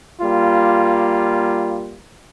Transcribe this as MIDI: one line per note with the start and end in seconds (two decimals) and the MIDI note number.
0.21 1.98 55
0.21 1.98 58
0.21 1.98 65